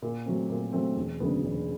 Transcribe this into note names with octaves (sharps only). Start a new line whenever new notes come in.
A#2
F#3 A3 C4
A#2
F#3 A3 C4
E1
D2 C#3 F#3 B3
E1